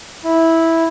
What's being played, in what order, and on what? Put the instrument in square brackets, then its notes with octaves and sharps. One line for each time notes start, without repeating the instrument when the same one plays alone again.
[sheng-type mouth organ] E4